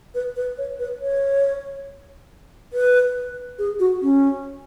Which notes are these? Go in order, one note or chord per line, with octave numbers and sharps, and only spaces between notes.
B4
B4
C#5
B4
C#5
B4
G#4
F#4
C#4